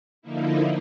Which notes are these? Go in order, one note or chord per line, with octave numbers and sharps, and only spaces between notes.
D3 F3 A#3 D#4 E4